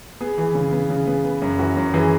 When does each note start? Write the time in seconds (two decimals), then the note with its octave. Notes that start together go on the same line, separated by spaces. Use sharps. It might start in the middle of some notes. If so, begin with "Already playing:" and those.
0.21 B3 G#4
0.38 E3
0.55 C#3
0.72 B3
0.90 C#3
1.07 B3
1.24 B3
1.42 F#2
1.59 E3 F#4
1.77 F#2
1.93 E3 G#4